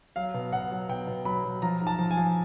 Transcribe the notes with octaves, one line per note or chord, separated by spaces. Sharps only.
F#3 F5
B2
B2 F#5
F#3
B2 G5
B2
F#3 B5
F#3
F3 A#5
G#2
A5
F3
G#5
F3